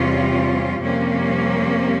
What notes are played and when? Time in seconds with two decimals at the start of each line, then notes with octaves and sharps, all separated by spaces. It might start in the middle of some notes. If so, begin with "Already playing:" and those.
Already playing: E2 C3 G3 C#4 F4
0.80 F2 C3 G3 A#3 C#4